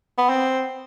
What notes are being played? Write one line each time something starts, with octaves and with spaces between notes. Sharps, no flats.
B3
C4